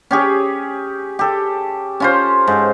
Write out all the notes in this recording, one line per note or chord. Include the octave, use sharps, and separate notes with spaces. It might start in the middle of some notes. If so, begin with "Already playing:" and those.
C#4 G4 G#4
G4 A4
C#4 F4 C5
G#2